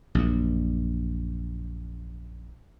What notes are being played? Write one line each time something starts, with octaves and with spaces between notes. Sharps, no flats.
A#1 F#2 A#2